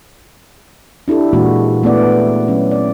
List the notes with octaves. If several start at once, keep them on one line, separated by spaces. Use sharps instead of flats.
D4 E4 G4 A4
A#2 E3 G#3 A#3 D4 F#4
A3 B3 E4 D5 F#5
F#3 C#4
D5